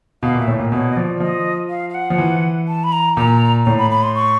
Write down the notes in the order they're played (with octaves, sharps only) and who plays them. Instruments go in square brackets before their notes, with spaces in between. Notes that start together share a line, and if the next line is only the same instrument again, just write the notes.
[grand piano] B2 [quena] F5
[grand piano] A#2 [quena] E5
[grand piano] A2
A#2
[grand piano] B2 [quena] C#5
[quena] D#5
[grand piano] F3 [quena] D5
[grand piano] F3 [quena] D#5
[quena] F5
F5
F#5
[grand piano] F3
E3
[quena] A5
B5
A#5
[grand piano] A#2 [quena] A#5
[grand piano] A2 [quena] A#5
[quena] B5
B5
C6
C#6